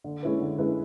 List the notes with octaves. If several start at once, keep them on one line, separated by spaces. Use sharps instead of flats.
D3
G#3 C#4 E4 B4
D3
G#3 C#4 E4 B4